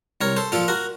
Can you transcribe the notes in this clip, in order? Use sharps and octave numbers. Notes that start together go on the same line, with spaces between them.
C2 A#4 C#5
A4 C5
A#2 F3 F4 A4
F#4 A#4